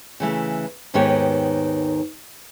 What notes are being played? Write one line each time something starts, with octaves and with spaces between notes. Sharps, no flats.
C#3 E3 A3
D#2 G#2 D#3 B3 G4 C#5